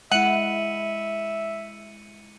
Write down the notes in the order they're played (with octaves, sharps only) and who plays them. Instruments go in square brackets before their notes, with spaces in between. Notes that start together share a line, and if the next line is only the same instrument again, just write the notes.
[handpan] G#3 E4 [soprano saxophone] E5 [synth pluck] F#5 [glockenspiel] C#7 D#7 F#7